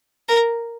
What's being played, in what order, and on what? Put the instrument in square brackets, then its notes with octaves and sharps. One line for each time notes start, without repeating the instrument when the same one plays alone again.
[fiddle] A#4